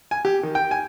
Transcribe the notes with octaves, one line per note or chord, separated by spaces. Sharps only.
G#5
G4
D#3
G5
G#5